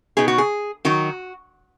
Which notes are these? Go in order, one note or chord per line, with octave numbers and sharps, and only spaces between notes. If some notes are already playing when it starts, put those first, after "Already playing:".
B2 B3 D#4 G#4
F#4
G#4
D#3 F#3 D#4 F#4